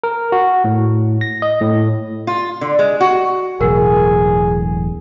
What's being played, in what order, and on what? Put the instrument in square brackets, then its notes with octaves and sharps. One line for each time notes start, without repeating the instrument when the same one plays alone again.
[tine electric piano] A#4
F#4
A2
A#6
D#5
A2
[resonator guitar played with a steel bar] F4
D3
G#3
F#4
[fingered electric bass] E1 B1 A2 [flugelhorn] G#4 [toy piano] A#4 F#5